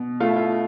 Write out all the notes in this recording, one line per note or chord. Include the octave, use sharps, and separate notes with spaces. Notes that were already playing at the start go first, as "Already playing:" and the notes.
Already playing: B2
A3 F4
E4
F4